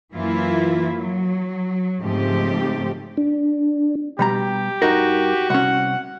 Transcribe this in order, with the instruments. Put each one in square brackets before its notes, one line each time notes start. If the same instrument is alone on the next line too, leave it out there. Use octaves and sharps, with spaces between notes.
[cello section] F#2 E3 A#3 E4 F4
F#3
G#2 C#3 F3 A3 C4 G4
[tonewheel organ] D4
[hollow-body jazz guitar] B2 G3 A#5 [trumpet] G4
[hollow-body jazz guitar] G2 D#4 A#4 [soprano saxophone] F#4
[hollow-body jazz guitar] C2 C#4 [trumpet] F#5